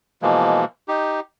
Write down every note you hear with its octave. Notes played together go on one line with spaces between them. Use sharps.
B2 E3 F3 G#3 A#3
D#4 G4